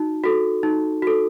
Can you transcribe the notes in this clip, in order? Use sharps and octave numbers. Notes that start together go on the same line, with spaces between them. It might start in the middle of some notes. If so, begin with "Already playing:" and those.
Already playing: D#4 F#4
F#4 A4
D#4
F#4 A4